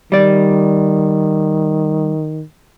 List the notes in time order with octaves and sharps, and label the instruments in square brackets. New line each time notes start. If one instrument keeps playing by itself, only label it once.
[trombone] D#3 [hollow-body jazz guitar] G3 D5